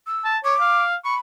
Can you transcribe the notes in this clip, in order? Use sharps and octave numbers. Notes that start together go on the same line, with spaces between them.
E6
A5
C#5 D6
F5
B5 C#6